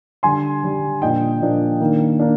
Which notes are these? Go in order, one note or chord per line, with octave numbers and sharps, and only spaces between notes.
D3 G3 D4 G#5 C6
D3 G3 D4
A#2 F3 A#3 D4 D#5 G5
A#2 F3 A#3 D4
D#3 A#3 D4
A#3 D4